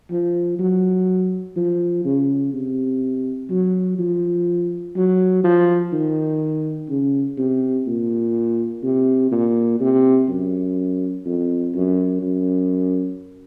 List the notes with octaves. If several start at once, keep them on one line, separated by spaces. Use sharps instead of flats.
F3
F#3
F3
C#3
C3
F#3
F3
F#3
F3
D#3
C#3
C3
A#2
C3
A#2
C3
F#2
F2
F#2
F#2